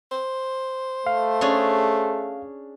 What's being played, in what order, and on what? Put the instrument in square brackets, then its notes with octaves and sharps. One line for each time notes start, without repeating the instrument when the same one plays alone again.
[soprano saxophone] C5
[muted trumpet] A3 [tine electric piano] F5
[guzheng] C#4 D4 G#4